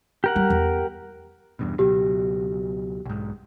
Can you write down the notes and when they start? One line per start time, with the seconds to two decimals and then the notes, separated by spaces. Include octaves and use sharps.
0.24 G4 A#4 F#5
0.36 G3
0.50 E2
1.59 E2 G2 B2
1.79 C#2 B2 F#3 G4
3.06 B1 G#2